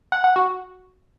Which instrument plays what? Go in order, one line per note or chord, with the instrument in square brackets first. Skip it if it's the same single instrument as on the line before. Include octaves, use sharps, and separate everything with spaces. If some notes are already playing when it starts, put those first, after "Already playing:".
[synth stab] F#5
F#5
F#4